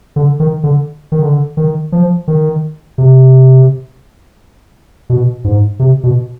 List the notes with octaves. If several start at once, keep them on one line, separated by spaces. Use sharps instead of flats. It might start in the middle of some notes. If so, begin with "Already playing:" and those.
D3
D#3
D3
D#3
D3
D#3
F3
D#3
C3
B2
G#2
C3
B2